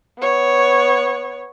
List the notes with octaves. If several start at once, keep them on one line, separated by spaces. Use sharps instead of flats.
B3 C#5